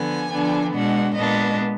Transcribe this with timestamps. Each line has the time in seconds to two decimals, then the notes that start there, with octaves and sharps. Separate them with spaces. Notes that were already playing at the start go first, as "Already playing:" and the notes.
Already playing: D3 F3 B3 G#5
0.32 D3 F3 B3 D4
0.74 B2 G#3 D4 F#5
1.15 A#2 G#3 B3 D4 D#5